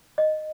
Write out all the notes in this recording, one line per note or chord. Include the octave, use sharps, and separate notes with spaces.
D#5